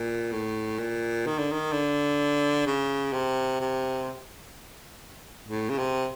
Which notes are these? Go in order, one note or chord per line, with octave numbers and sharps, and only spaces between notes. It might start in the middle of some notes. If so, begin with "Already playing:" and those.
Already playing: A#2
A2
A#2
D#3
D3
D#3
D3
C#3
C3
C3
A2
C#3
C3